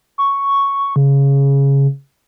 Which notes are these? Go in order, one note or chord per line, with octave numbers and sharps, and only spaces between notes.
C#6
C#3